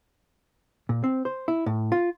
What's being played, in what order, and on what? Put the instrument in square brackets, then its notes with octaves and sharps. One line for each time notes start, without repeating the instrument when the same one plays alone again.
[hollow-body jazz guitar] A#2
C4
C5
E4
A2
F4